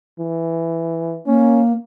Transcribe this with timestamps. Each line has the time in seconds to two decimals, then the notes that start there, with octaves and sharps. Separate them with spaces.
0.19 E3
1.26 A#3 C#4